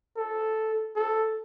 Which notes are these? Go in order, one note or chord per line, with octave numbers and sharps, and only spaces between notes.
A4
A4